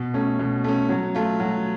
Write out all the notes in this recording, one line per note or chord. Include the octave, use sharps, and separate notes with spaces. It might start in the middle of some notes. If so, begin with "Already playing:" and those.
Already playing: B2
A3 C#4
B2
A3 C#4
F#3
A3 F4
F#3